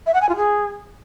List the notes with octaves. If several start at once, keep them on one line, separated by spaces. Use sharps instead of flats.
E5
F#5
G#5
F4
G#4